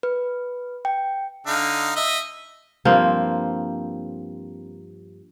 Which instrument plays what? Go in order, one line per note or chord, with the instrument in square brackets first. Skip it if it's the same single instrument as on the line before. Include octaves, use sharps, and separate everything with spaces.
[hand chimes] B4
G5
[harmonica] D3 D#4 F5
D#5 E5
[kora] G2 F3 A#3 C4